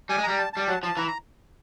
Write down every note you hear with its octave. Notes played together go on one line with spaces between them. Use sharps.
G3 G#5
G#3
A#5
G3
A5
G3 A5
F#3 A5
F3 A5
E3 A#5
A#5